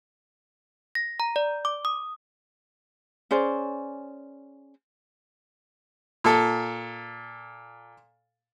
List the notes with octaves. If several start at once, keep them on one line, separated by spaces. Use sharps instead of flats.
A#6
A#5
D5
D6
D#6
C#4 G#4 C5 D5
A#2 A4